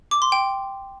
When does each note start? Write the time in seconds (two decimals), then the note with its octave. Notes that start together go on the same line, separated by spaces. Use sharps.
0.11 D6
0.22 C6
0.32 G5